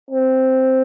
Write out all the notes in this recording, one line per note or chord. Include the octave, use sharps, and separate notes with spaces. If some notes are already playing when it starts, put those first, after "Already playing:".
C4